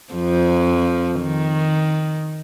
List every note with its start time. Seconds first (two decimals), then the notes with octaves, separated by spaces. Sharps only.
0.14 F2 F3
1.21 D#3